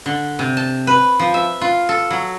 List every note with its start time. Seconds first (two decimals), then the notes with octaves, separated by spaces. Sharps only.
0.06 D3
0.39 C3
0.57 A5
0.87 B4
1.19 F3
1.34 E5
1.61 F4
1.89 A4
2.10 F#3